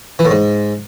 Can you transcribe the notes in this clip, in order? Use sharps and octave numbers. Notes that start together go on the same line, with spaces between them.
E3
A2
G#2